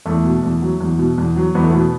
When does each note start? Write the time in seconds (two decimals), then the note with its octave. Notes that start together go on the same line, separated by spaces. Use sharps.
0.06 E2 A3
0.25 B2
0.43 E2
0.62 F#3
0.80 E2
0.99 B2
1.18 E2
1.36 F#3
1.55 E2 B3
1.64 A3
1.72 B2 B3